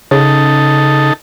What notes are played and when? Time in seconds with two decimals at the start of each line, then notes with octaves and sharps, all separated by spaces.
0.11 C#3 D#4 A4